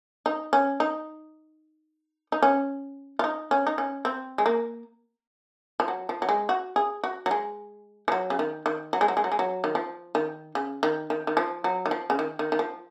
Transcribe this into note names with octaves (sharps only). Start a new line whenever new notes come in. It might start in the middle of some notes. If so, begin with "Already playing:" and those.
D#4
C#4
D#4
D#4
C#4
F4
D#4
C#4
D#4
C#4
C4
G#3
A#3
F3
F#3
F3
F#3
G#3
F#4
G#4
F#4
F#3
G#3
F3
F#3
C#3
D#3
D#3
F#3
G#3
F#3
G#3
F#3
G#3
F#3
D#3
F3
D#3
C#3
D#3
D#3
D#3
F3
F#3
D#3
F3
C#3
D#3
D#3
D#3
F3